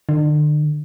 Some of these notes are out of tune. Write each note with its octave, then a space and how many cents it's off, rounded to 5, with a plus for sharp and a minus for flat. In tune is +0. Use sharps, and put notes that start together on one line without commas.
D3 +35